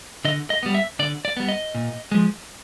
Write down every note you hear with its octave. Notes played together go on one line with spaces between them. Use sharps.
D3 D#5
D#5
G3 B3
E5
D3 D5
D5
G3 B3
D#5
A#2
F3 G#3